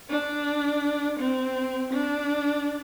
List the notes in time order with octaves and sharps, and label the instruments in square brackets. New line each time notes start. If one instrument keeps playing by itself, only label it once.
[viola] D4
C4
D4